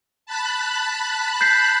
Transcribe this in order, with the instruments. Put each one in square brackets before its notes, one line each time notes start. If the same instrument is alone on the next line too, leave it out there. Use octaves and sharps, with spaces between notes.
[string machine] A5 B5 F#6
[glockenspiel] G6 B6 C7